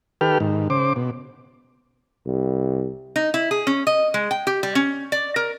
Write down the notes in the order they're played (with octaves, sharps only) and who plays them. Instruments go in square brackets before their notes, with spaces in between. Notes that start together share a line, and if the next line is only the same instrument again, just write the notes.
[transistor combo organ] D#3 G4 A4 B4 G5 F6
G#2 D#3
C#3 C5 D6
B2
[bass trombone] C2
[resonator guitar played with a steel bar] D#4
E4
G#4
C#4
D#5
G#3
G5
G4
G3
C#4
D5
A#4